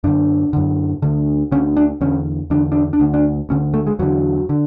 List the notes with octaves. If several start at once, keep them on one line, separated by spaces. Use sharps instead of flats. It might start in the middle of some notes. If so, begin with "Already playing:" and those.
F#2 D3 D4
F#2 D3
D2 D3
D2 D3 C#4
D4
E2 D3 C#4
E2 D3 D4
D4
D4
D2 D3
D4
D2 D3 C#4
A3
G#3
E2 D3 F#3
D3